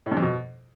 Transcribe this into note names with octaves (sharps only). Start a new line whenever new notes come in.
A2
G2
F2
B2